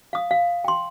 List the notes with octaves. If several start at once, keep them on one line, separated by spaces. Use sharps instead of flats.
F5 D#6
F5
G5 C6